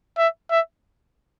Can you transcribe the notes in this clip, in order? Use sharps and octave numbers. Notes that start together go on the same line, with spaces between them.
E5
E5